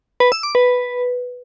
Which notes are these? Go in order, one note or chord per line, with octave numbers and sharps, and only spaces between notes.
B4
E6
D6
B4